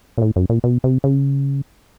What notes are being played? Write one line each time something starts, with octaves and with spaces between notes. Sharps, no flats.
A#2
A2
F#2
A#2
B2
C3
C#3